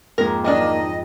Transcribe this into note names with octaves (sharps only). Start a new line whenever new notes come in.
F2 G#2 A#3 A#4
D#3 F#3 D4 D#5